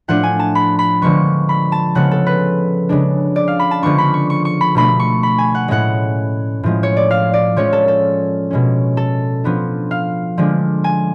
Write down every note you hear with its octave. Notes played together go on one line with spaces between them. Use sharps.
A2 F3 A3 D4 F#5
G#5
A5
B5
B5
D3 F3 G#3 B3 C#6
B5
A5
C#3 F3 G#3 B3 F#5
A4
B4
C#3 G#3 D4
D5
F5
B5
A5
D3 F3 G#3 B3 D4 C#6
B5
C#6
C#6
C#6
B5
B2 A3 D4 B5
C#6
B5
G#5
F#5
A2 G#3 C#4 F#5
A2 F3 G#3
C#5
D5
F5
D5
F3 G#3 C#4 C#5
A4
A4
B2 G#3 C#4
A4
F3 B3 D4
F5
D3 F3 G#3 D4
G#5